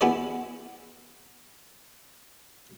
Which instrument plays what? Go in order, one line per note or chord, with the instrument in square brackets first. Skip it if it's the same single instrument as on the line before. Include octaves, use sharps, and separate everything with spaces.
[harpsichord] B3 E4 G#4 D5